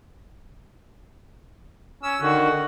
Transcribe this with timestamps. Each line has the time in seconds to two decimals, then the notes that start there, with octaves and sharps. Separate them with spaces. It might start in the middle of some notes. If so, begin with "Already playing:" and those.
2.03 C#4 E6
2.21 D3 D#3 F#4